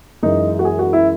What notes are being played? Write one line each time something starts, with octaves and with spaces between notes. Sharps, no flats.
F#2 E3 G#3 D#4
F#4
G#4
F#4
E4